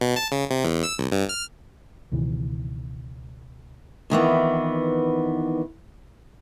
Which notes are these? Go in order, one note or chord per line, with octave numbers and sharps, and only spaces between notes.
B2
A5
C#3
C3
E2
E6
C2
G2
F6
C#2 B2 D#3 E3
F2 D#3 E3 B3